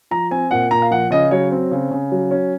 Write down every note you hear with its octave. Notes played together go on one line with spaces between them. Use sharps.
F3 A#5
C4 G#5
A#2 F#5
A#2 A#5
F5
F3 F#5
C#3 D#5
F#3 C#5
C4
C#3
C#3
F#3
C#4